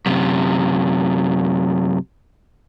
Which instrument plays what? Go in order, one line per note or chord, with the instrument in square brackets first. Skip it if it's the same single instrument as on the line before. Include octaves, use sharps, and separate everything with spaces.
[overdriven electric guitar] F#2 C3